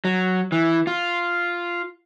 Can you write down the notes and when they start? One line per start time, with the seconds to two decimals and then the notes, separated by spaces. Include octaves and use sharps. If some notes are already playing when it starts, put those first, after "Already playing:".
0.05 F#3
0.52 E3
0.87 F4